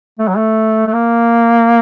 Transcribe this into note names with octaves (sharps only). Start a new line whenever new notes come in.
A3
F#3
A3
A3
A#3